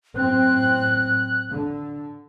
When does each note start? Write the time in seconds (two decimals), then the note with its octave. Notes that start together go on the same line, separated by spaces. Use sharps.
0.17 F#2 A2 C4 F#6
1.50 D3